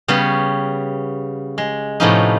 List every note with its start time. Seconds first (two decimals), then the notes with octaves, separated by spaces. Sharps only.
0.08 C#3 G3 B3 C#5
1.58 G#3
2.00 A2 C3 F3 B3 C#4 D#4